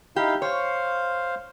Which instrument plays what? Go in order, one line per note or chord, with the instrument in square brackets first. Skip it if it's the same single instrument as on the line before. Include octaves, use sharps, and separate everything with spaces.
[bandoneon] D#4 E4 F5 [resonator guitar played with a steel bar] G4
[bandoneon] C5 F5 [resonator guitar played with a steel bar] C#5